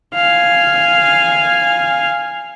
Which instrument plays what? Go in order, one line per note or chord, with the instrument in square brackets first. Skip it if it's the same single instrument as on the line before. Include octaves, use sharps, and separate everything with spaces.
[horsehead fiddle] F5 G#5